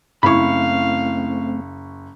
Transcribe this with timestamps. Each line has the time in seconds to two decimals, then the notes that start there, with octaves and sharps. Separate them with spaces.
0.23 F#1 A3 C4 E4 F5 B5 C#6